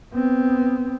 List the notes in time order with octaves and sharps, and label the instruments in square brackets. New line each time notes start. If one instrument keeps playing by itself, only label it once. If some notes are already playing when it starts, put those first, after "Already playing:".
[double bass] B3 C4